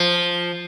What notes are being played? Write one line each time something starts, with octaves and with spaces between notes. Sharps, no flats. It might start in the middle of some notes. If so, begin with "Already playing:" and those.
Already playing: F3